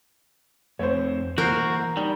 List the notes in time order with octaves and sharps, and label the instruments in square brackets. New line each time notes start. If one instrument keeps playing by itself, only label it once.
[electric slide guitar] F2 A3 C4 [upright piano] C5 C#5
[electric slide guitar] E3 A#3 C5 [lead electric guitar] F#4 [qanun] A#4 [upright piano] G6 C7
[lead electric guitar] G3 [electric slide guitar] D#4